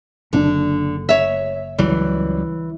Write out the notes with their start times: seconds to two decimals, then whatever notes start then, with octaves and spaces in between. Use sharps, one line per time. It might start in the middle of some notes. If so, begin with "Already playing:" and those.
0.33 F#1 D3 C#4 D4
1.09 C#5 E5
1.79 C#2 E3 F#3 G3